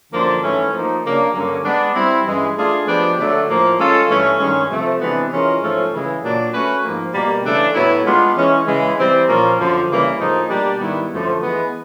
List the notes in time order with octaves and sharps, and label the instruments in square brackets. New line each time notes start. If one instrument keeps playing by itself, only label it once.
[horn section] F#2 D3 F3 A#3 D4
G#2 E3 A3 C#4
F3 A#3 D#4
C#3 F#3 A#3 D4
G2 D3 F#3 A#3 C#4
G#3 B3 D4
G3 C4 E4
G2 E3 G#3 C#4
A3 D4 F4 G#4
F3 G#3 B3 D4 G4
D3 F#3 A3 D4
A2 F3 A#3
G#3 C#4 F4 A4
G2 E3 A3 C#4
G2 D#3 G#3 C#4
C3 F3 A3
C3 E3 G#3 B3 D4
E3 G#3 C#4 F4 A#4
G#2 F3 A3 C#4 F4
C#3 E3 G#3
A#2 F#3 A#3 D4
A3 C#4 F#4 B4
G#2 F3 A#3
B2 G3 A#3
C#3 E3 A3 D4
A2 F#3 B3 E4
G#3 B3 D4 F4
E3 G#3 C#4
C#3 E3 G#3
E3 G3 C4
A#2 F3 A#3 C#4 F4
F#2 D3 F3
C#3 E3 G3 A#3
A2 F3 A#3 D#4 G#4
B2 G3 A#3 D4 G4
G#2 D#3 G3 B3 E4
F#2 D3 F3 A3
E3 G#3 B3